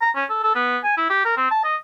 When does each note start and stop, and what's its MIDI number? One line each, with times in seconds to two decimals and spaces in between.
0.01 0.10 82
0.15 0.24 61
0.29 0.39 69
0.43 0.54 69
0.55 0.77 59
0.83 0.95 80
0.97 1.07 64
1.09 1.24 67
1.25 1.36 70
1.37 1.47 60
1.51 1.59 81
1.64 1.76 75